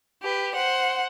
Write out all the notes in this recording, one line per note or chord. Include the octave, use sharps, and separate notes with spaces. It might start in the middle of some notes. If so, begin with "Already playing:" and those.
G4 B4
C5 F#5